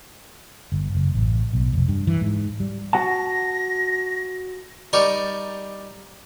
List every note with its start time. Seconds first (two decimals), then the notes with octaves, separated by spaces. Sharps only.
0.72 G1
0.95 F#1
1.15 A1
1.53 B1
1.73 F1
1.88 G2
2.07 E3
2.21 G#2
2.60 G3
2.93 F#4 F#5 A5 A#6
4.93 G3 D#4 G4 A#4 D5 C#6